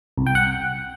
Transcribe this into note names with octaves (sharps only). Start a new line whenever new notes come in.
C2
G5
F#5